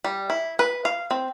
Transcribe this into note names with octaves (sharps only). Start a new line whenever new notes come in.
G3
E4
B4
F5
C4